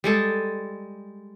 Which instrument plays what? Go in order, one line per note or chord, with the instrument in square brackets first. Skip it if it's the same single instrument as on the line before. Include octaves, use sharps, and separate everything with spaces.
[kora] G3 G#3 A4